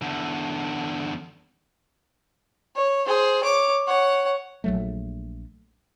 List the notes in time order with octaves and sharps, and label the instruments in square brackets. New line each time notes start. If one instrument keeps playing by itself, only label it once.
[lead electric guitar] E2 D3
[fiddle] C#5
G#4 C5
C#5 D6
C#5 F#5
[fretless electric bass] A#1 F#3 A3